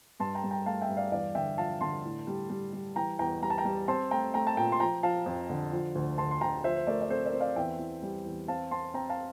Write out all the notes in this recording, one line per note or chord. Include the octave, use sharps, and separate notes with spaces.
G2 A5 C6
G5 A#5
G2
G5 A#5
A3 F5 A5
E5 G5
G2
D5 F5
E2 D5 F5
D3 E5 G5
F3 F5 A5
D3 A5 C6
A2
G3
G3
G3
E3 G5 A#5
E2 G5 A#5
G3 A#5
A5
G5 A#5
G3
C4 A5 C6
A3 G5 A#5
A3 G5 A#5
A5
A#2 G5 A#5
C6
F3 G5 A#5
F3 F5 A5
F2
D3
F3
D2
D2 A5 C6
C6
D2 G5 A#5
F3 C5 E5
C5
A3 A#4 D5
D5
C4 A4 C5
A#4 D5
C4
D5 F5
E2 E5 G5
E3
G3
E2
C4 F5 A5
C4 A5 C6
C4 G5 A#5
F5 A5